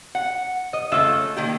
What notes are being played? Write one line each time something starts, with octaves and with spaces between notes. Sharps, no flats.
F#5
D#5
C#3 A3 F4 E5
D#3 A#3 G4